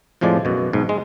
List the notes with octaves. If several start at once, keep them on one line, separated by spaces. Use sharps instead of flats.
F2 A2 F3 G#3 D5
F#2 B2
B1 G#2
G#3